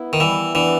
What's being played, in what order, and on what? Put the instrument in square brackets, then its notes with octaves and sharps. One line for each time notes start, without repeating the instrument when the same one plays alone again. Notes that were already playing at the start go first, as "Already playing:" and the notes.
Already playing: [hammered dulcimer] B3 E4
[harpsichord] D#3
[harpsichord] E3 [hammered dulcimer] G3
[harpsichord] E3 [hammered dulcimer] B3 D4